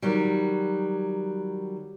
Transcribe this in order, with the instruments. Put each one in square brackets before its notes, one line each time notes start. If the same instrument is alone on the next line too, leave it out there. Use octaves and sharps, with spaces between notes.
[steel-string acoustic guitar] D#3 F#3 G3